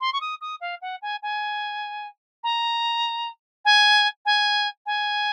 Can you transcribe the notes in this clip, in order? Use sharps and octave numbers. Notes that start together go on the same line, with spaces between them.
C6
C#6
D#6
D#6
F5
F#5
G#5
G#5
A#5
G#5
G#5
G#5